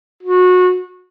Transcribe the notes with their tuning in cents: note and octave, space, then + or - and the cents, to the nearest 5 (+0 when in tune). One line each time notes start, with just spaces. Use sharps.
F#4 -25